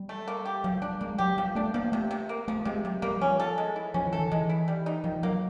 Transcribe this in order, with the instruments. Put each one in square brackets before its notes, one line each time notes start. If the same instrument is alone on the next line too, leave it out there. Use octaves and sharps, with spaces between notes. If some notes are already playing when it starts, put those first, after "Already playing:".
Already playing: [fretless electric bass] G3
[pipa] A3
A#3
G4
[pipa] F3 [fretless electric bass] F#3
[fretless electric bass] G3 [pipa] D4
[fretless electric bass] G#3 [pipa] A#3
[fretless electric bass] F#3 [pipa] G4
[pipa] F3 [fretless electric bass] G3
[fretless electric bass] A3 [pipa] D4
[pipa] F3 [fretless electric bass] A#3
[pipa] C3 [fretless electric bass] A3
[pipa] C3
A#3
[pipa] F3 [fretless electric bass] A3
[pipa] C3 [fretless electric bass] G#3
[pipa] C3 [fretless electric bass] F#3
[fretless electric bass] G3 [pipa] A#3
[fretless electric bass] F3 [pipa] C#4
[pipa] A4
G#3
E4
[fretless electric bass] F3 [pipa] C#4
[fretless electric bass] E3
[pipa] A4
[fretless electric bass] D#3
[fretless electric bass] E3 [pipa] G#3
[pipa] E4
G3
D#4
[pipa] D#3 [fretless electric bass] F3
[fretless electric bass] F#3 [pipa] A#3